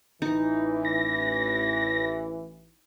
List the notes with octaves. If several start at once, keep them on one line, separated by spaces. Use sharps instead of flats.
A1 E3 D#4
A#6